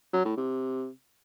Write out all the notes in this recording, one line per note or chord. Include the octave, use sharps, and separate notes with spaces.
F#3
A2
C3